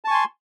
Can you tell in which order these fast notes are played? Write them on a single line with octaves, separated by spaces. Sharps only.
A5 C#6 G#5 C6